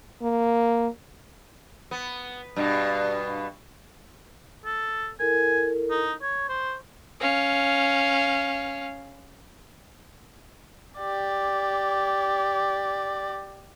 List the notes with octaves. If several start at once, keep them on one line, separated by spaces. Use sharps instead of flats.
A#3
B3
G2 B2
A4
E4 A4 A#4 G#5
D#4
C#5 C#6
C5
C#4 F5
G4 D5